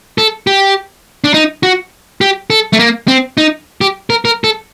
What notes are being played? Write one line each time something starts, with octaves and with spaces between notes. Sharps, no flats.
A4
G4
D4
D#4
F#4
G4
A4
A3
A#3
C4
D#4
G4
A#4
A#4
A4